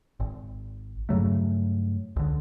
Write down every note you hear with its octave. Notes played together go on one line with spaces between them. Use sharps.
G#1
G2 C#3 F#3 A3
C#2 D3